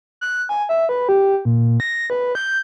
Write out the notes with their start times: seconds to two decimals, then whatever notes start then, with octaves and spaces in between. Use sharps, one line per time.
0.21 F#6
0.49 G#5
0.69 E5
0.89 B4
1.09 G4
1.45 A#2
1.80 A#6
2.10 B4
2.35 G6